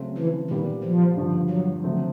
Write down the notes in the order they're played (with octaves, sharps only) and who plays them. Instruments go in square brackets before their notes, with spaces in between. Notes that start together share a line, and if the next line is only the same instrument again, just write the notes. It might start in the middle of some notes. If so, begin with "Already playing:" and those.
Already playing: [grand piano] C#3 F#3 A3 C4
[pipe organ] E3
[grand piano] A#2 G3 B3 [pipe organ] D#3
[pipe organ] F3
[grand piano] G2 D3 F3
[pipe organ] F#3
[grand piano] D3 F#3 A3 C4